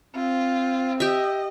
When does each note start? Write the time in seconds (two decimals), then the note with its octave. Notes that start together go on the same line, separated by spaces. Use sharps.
0.15 C4 F4
1.00 G4 D#5 E5